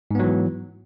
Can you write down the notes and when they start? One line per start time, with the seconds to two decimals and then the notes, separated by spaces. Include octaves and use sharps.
0.11 G#2
0.15 B3
0.19 F#3
0.24 E3